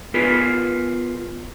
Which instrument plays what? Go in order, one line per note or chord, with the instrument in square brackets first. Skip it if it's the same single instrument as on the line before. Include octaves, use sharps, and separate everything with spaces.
[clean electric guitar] B3 F4 G#4 A#4 B4